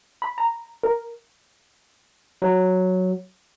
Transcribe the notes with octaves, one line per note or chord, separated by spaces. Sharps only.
B5
A#5
A#4
F#3